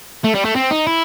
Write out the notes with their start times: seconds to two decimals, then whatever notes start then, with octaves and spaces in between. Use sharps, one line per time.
0.24 A3
0.35 G3
0.45 A3
0.56 C4
0.71 D#4
0.87 E4